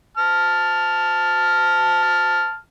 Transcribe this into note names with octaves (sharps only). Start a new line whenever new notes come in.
A5 F6